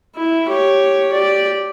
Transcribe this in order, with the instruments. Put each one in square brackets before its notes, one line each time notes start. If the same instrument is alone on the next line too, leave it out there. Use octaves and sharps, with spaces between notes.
[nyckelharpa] E4
G4 C#5
G4 D5